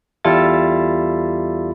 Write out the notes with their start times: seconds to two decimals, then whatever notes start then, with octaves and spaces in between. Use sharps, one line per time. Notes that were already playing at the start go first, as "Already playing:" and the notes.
0.24 E2 G3 E4 F4 A4 A6